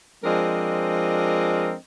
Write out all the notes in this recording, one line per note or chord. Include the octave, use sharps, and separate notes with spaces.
F3 G#3 C4 D4 A#4 D#5